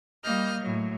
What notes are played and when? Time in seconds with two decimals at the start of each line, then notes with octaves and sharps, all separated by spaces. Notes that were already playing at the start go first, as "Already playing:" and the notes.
0.23 G3 A#3 D#5 F6 G6
0.60 A2 F#3